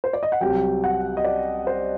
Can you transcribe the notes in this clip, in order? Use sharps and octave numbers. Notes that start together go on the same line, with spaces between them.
C5
D5
D#5
F#5
C2 C3 F#3 G5
F#5
D#5
D5
C5